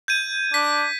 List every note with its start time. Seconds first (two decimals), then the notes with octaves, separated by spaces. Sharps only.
0.08 G6 G#6 D#7
0.54 D4 B6